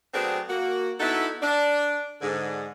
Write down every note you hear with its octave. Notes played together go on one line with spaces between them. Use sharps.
F#3 A3 B3 C4 D4 G#4
A#3 F#4
B3 D#4 E4 F#4 A4
D4
G#2 D3